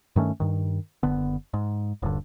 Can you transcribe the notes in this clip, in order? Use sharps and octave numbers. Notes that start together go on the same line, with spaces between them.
G2 D#3 A3 C#4
G2 D#3
F#1 D3 B3
G#2
D#1 G2 D3